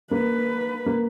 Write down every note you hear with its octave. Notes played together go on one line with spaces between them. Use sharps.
A#3 B4
A#3